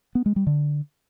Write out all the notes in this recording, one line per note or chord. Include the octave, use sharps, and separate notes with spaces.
B3
G#3
G3
D3